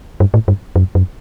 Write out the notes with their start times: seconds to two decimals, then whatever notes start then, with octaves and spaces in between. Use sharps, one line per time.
0.20 G2
0.34 A2
0.48 G2
0.76 F#2
0.95 F#2